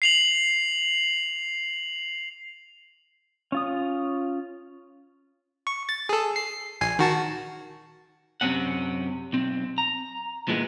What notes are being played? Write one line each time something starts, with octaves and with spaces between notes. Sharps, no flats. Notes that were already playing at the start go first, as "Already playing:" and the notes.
C7 F7 F#7
C#4 F4 D#6
C#6
A6
G#4 A4
C7
A#1 G#5 C7
D#3 F#4 A5
F#2 C3 A3 C4 C#4 F#5
B1 C4
A#5
A#2 E3 G#3 B3